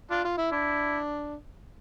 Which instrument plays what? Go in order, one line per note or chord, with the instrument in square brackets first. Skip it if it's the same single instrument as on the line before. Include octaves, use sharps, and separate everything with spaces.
[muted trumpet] D4 [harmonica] F4
[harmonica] F4
E4
[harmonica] D4 [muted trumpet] E4